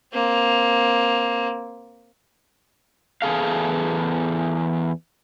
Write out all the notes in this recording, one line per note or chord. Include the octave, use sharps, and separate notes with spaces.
A#3 C4
E2 G#4 A4 F5